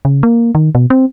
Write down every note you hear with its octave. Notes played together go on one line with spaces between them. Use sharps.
C#3
A#3
D#3
B2
C4